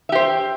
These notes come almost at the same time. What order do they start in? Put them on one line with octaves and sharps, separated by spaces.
E5 G4 C5